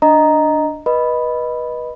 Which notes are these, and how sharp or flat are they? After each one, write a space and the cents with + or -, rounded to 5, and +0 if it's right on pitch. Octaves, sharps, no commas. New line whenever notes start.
D4 +0 D#5 +0 A#5 +0
B4 -25 D#5 +0 B5 +0